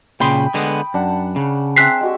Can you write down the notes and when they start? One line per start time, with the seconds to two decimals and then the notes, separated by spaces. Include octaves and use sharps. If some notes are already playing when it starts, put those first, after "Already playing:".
0.20 A#2 C#3 G5 B5 C6 D#6
0.54 D3 G#3 B3
0.94 F#2 D4 F#5 A5
1.36 C#3
1.76 C4 G#4 E5 F#6 B6 C7
2.01 G#3 F#4 G4